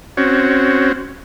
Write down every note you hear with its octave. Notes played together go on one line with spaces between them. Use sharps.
C4 C#4 F#4